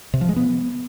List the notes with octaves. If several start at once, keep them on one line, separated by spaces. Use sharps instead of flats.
C3
F3
G#3
B3